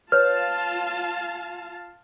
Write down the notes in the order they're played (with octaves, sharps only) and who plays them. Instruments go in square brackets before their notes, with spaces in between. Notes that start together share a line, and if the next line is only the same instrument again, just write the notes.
[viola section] F4 F5 A5 [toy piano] B4 C#5 [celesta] F6